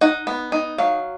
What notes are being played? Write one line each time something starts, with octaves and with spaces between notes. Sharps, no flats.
D#4 F#5
B3
D#4
F#3 F5